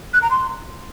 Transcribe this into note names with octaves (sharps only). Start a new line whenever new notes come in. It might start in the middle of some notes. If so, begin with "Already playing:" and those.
F#6
A#5
C6